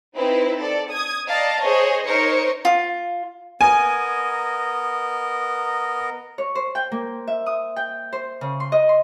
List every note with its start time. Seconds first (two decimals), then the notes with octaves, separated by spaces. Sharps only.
0.15 C4 D#4 E4 B4
0.59 A4 D5
0.89 D#6 G#6
1.28 D5 D#5 F5 A5 A#5
1.62 G#4 C5 C#5 D#5
2.05 D#4 A#4 C5 C#5 C#7
2.65 F4
3.61 B3 A#4 D#5 G#5
6.38 C#5
6.55 C5
6.75 G5
6.92 A#3
7.27 E5
7.46 D#6
7.76 G5
8.13 C5
8.41 C#3
8.60 C6
8.72 D#5
8.89 C6